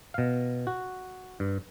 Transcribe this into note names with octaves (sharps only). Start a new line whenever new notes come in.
B2 F5
F#4
G2